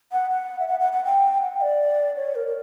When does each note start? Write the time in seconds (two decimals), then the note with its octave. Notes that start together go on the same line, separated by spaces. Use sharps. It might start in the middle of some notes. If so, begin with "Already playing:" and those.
0.12 F#5
0.30 F#5
0.60 E5
0.68 F#5
0.80 F#5
0.92 F#5
1.05 G5
1.42 F#5
1.61 D5
2.16 C#5
2.35 A#4
2.47 A#4